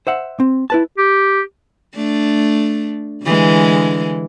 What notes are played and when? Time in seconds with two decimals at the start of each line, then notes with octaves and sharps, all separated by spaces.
0.07 C5 E5 F#5
0.40 C4
0.70 E4 B4 A5
0.98 G4
1.95 A3 D4
3.24 D3 E3 G#3